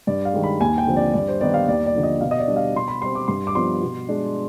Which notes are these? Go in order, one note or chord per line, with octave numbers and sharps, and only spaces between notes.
G2 D5
F5
D#3 G#3
B5
D#2 G#5
G5
D3 F3 C4
D5
G2 D5
C5
D#3 B3 D#4 D5
F5
D#2 D5
D5
D3 F3
D#5
B2 F5
D#5
D5
G3 D4
F5
B2 C6
B5
G3 C4 C6
D6
G2 C6
D6
F3 B3 D4 C6
B2
G#3 D4